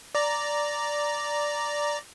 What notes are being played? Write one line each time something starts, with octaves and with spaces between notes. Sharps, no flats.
D5 A#5